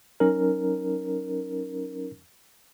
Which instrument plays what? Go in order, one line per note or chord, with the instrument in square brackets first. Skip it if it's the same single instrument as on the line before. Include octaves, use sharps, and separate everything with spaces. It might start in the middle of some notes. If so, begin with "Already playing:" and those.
[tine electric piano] F#3 C#4 D#4 A#4